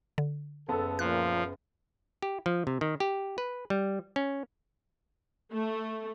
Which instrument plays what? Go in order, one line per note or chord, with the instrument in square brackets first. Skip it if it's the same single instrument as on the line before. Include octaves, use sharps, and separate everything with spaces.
[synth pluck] D3
[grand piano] F#1 B3 A5 [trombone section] A4
[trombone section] A#2 F4 [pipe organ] F3 [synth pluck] F#6
[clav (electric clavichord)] G4
F3
C3
D#3
G4
B4
G3
C#4
[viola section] A3